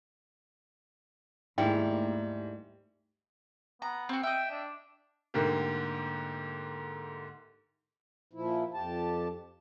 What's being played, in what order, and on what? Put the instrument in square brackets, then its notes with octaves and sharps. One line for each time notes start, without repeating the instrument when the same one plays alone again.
[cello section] D#2 A3 [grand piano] G#2 [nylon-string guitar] G3 E4 [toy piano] G5
[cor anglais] B3 [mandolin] A#5
[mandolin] C4 F#4
[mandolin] D#5 E5 [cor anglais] G5
[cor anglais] D4
[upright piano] G#2 D3 A3 A#3 G4
[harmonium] A#2 F3 E4
F2 G4 A5